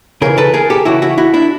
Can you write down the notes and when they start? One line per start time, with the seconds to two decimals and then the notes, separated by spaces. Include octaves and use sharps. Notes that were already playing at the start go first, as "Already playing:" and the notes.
0.22 C#3 E3 G#4 A#4
0.38 A4 B4
0.54 G#4 A#4
0.70 G4 A4
0.85 C#3 E3 E4 F#4
1.02 E4 F#4
1.18 E4 F#4
1.34 D4 E4